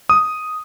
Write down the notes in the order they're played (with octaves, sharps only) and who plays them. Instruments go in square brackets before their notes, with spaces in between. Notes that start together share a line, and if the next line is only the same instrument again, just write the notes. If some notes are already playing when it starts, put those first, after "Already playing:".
[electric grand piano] D#6